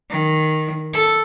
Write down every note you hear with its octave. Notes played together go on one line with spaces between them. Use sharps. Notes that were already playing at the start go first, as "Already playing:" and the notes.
D#3
A4